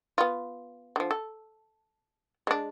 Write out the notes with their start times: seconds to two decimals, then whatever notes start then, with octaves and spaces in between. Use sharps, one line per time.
0.18 B3 F4
0.96 D3 F3
1.11 A4
2.47 G#3 D4